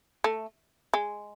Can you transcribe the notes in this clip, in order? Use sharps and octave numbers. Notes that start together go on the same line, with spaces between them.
A3
G#3